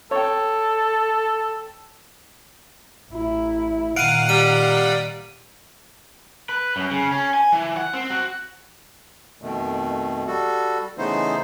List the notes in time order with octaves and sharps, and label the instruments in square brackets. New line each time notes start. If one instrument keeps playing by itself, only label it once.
[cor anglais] A4 [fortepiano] C#5 G5
[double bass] A1 E4
[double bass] A#2 D#3 [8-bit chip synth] F5 F#5 [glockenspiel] D7 D#7
[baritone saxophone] G3 [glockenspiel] D#7
[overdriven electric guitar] B4
F#2
C#3
C#4
G#5
E3
F#5
C4
F#4
[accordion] F2 B2 D#3 A3
G3 F#4 A4
C#3 E3 A3 B3 D#4 C5